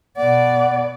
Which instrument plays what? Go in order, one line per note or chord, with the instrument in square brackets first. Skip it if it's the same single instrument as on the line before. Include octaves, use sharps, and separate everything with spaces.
[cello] B2 D5 [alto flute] F#5